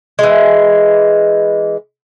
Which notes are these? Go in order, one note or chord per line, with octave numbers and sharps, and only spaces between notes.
E3 G#3